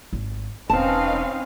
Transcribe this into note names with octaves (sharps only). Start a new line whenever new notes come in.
G#1
E1 C4 C#4 D#4 B4 F5 A5